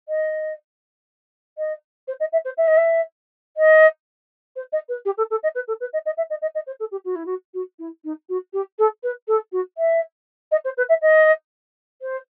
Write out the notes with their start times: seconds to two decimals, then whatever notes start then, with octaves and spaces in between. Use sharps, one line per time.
0.09 D#5
1.58 D#5
2.08 C5
2.20 D#5
2.32 E5
2.45 C5
2.57 E5
2.67 D#5
2.77 E5
3.57 D#5
4.56 C5
4.72 D#5
4.89 B4
5.05 G4
5.17 A4
5.31 A4
5.43 D#5
5.55 B4
5.68 A4
5.80 B4
5.93 D#5
6.06 D#5
6.17 E5
6.30 D#5
6.42 D#5
6.55 D#5
6.67 C5
6.80 A4
6.91 G4
7.05 F#4
7.16 E4
7.26 F#4
7.54 F#4
7.79 E4
8.04 D#4
8.29 F#4
8.53 G4
8.79 A4
9.03 B4
9.28 A4
9.52 F#4
9.78 E5
10.52 D#5
10.65 C5
10.77 B4
10.89 E5
11.02 D#5
12.02 C5